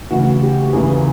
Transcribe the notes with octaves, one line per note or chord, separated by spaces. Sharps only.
D2 C#3 E3 F#4
G4
E2 C#3 E3 G#4